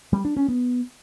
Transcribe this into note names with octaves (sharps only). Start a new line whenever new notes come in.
G3
D4
C#4
B3